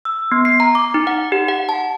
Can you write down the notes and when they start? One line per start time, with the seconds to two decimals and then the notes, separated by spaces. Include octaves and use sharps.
0.05 E6
0.32 B3
0.45 C7
0.60 A#5
0.75 D6
0.94 D#4
1.07 F#5
1.32 G4
1.48 F#5
1.69 A5